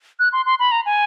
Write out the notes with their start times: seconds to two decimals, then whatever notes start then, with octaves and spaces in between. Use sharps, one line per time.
0.19 F#6
0.32 C6
0.46 C6
0.59 B5
0.72 A#5
0.86 G#5